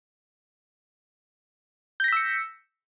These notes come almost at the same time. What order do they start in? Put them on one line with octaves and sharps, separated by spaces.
G6 A#6 B6 E6 C#7